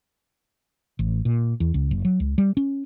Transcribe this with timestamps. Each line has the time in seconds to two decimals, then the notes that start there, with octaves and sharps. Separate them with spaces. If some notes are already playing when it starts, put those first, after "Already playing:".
0.99 A1
1.25 A#2
1.60 E2
1.74 C#2
1.91 F#1
2.05 F#3
2.20 C#2
2.38 G3
2.57 C#4